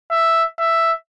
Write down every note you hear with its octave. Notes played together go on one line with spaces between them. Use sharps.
E5
E5